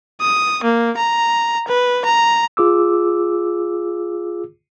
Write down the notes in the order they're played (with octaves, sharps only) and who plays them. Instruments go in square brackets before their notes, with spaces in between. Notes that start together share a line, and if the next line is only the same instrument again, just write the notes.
[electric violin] D#6
A#3
A#5
B4
A#5
[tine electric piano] F4 G#4 D6 E6